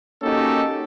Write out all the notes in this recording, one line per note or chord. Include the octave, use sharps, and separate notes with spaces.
A#3 C#4 D#4 F#4 G4 A4